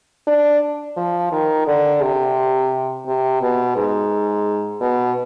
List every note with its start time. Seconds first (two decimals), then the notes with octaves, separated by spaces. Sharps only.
0.27 D4
0.97 F3
1.32 D#3
1.67 D3
2.02 C3
3.06 C3
3.42 B2
3.76 G#2
4.81 B2